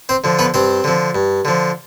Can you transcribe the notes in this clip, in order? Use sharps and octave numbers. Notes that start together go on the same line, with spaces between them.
C4 C5
D3 F3
B3 B4
G2 C4 C5
D3 F3
G2
D3 F3